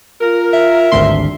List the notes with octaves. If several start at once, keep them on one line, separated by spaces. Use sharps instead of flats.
F4 A#4
E5
G#1 D2 G2 C6